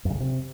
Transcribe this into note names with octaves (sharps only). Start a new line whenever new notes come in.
F#2
C#3
D3
C3